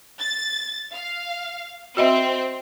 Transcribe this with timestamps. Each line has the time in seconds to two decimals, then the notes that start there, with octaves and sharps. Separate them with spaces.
0.20 A6
0.94 F5
1.97 C4 F#4 D#5 E5